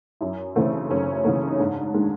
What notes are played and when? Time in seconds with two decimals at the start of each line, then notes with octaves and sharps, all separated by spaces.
0.21 F#2 E4
0.55 C#3 E3 A3 C4
0.90 F#2 C#4
1.25 C#3 E3 A3
1.48 D#4
1.59 G#2 D4
1.94 D#3 G#3